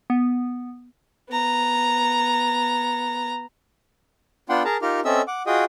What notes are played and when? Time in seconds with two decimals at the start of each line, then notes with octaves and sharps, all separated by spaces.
0.10 B3
1.29 B3 A#5
4.49 B3 D4 F4 F#5 G5 C6
4.65 G#4 A#4 A5 A#5
4.82 D#4 F4 G4 A#4 F6
5.05 C4 C#4 A4 D#5 E5 E6
5.28 F#5 D6
5.46 F4 F#4 G#4 D#5 G5 D#6